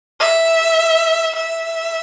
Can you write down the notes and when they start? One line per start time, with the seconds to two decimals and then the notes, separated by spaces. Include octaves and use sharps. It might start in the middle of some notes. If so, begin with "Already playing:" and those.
0.20 E5
1.35 E5